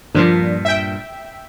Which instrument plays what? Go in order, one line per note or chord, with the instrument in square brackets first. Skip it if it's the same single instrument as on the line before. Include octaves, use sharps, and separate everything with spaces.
[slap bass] G2 A#2 [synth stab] F3 A#3 D4
[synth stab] E5 G5